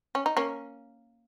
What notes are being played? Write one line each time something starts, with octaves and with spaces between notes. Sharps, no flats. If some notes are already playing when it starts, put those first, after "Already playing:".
C#4
D#4
A#3 C#4